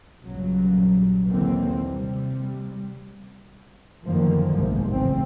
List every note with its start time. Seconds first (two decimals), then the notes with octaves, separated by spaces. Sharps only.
0.23 A#1 G2 C#3 F#3
1.27 D#2 D3 E3 A#3 C4
1.87 C3 G3
4.06 F#2 D3 D#3 F3 A#3
4.57 F#1 B1 G#2 C3
4.92 A1 C#3 C4